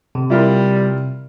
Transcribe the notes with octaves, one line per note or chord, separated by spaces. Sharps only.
C3
G3 E4 F4 A#4